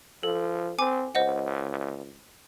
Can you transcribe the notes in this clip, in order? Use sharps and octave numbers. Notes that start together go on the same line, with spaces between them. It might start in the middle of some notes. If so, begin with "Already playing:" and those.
F3 A4
C4 G#5 D6
C#2 C5 D#5 F#5